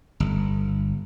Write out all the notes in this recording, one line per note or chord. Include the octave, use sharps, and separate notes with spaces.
G1